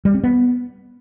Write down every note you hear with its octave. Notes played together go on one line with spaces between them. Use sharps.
G3
C4
B3